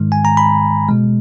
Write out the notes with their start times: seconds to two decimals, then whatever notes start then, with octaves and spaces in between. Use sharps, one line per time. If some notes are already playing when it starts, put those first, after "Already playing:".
Already playing: G#2 D#3 G#3
0.12 G#5
0.25 A#5
0.37 B5
0.89 B2 G#3